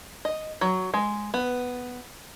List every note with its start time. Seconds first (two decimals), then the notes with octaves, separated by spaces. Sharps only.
0.25 D#5
0.61 F#3
0.94 G#3
1.34 B3